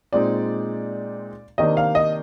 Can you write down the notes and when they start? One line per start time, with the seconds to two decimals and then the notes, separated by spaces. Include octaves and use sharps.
0.13 A#2 G#3 C4 D#4 D5
1.58 C3 D#3 A#3 D4 D#5
1.77 F5
1.95 D#5